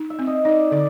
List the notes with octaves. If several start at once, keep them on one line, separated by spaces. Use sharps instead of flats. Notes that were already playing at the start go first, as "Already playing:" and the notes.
Already playing: D#4
E5
C4
D#5
D#4 D5
D3 D5